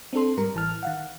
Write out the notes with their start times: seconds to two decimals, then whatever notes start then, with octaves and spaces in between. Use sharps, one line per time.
0.13 C4 D4 A4 C6
0.37 G#2 G3 A#4
0.54 A1 E3 A5 F6
0.83 D#3 F5 F#5